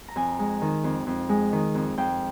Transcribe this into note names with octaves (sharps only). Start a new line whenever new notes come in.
A#5
F2 G#5
G#3
D#3
F2
F2
G#3
D#3
F2
F2 G5